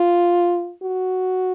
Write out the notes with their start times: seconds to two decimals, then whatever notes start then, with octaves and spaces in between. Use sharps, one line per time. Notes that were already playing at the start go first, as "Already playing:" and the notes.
Already playing: F4
0.83 F#4